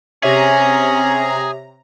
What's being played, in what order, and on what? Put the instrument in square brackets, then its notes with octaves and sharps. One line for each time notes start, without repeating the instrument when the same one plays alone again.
[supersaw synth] C3 A#5 [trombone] C#4 [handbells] G4 C#5 E5 [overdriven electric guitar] G#4